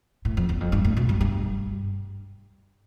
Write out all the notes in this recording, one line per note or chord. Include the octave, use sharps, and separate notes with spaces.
A2
F2
E2
F2
G2
A2
B2
G2
G2